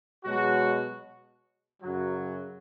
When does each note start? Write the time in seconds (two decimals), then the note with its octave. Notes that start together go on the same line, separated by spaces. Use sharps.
0.24 B2 F#3 G#3 F#4
1.83 F#2 C#3 F#3